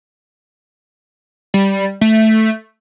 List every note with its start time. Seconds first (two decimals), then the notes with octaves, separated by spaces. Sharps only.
1.54 G3
2.01 A3